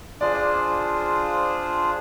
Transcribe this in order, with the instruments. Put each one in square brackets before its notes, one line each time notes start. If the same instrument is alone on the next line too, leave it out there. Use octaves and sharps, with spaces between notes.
[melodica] D4 F4 G#4 C5 [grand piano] D5